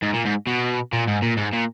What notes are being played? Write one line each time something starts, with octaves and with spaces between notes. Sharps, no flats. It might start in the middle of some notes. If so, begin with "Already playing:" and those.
G#2
A#2
G#2
B2
A#2
G#2
A#2
G#2
A#2